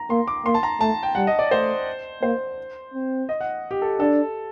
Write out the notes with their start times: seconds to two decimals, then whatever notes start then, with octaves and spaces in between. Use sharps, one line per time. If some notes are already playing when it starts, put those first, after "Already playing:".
Already playing: A#5
0.10 A#3 C6
0.28 D6
0.45 A#3 C6
0.54 A5
0.63 A#5
0.80 A3 A5
1.03 G5
1.15 G3 F#5
1.27 D#5
1.39 D5
1.51 A3 C5
2.22 A#3 C5
2.94 C4
3.29 D#5
3.41 F#5
3.71 G4
3.82 A4
4.00 D4 A4